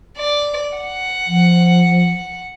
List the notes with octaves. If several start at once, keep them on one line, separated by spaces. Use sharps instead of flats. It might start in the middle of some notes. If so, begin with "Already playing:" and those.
D5
F#5
F3